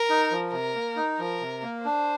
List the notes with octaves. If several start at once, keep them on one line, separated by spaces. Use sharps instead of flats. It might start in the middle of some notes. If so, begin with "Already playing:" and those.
Already playing: A#4
D#4
F3
C3 A#4
A#3
D#4
F3 A#4
C3
A#3
D4 C5